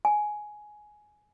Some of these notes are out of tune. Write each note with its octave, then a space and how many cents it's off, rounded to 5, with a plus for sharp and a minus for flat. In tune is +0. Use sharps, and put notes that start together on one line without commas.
G#5 +10